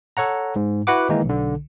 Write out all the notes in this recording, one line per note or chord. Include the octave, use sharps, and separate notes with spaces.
A4 C#5 F#5 A#5
G#2
E4 F#4 B4 F#5 D6
D#3 E3 G#3 A#3 D#4
B1 D3